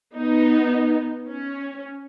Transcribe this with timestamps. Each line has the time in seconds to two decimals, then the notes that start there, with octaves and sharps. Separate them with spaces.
0.14 B3 D#4
1.27 C#4